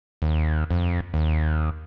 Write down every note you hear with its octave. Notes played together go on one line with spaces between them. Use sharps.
D#2
F2
D#2